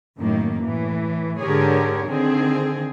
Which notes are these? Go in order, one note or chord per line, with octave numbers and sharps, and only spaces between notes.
F#2 A2 D#3 A#3
A2 E3
G#2 D3 G4 G#4 A#4 C#5
D3 D#3 C4 G#4